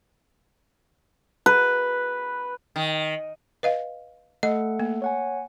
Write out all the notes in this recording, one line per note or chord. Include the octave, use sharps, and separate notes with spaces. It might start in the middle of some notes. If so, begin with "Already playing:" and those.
B4
D#3
B4 D#5 F5
A3 A4 D#5 F#5
A#3
C#5 F#5 G#5